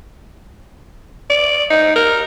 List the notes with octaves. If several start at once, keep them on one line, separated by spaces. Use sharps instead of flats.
D5
D#4
A#4